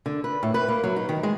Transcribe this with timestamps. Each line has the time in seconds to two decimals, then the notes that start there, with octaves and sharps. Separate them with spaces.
0.06 D3
0.24 B4
0.43 A2
0.54 B4
0.68 A#3
0.84 F#3
0.96 D#4
1.09 D#3
1.23 G#3